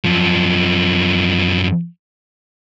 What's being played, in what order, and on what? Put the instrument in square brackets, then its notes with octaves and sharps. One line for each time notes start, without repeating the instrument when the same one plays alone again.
[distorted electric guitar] F#2 F3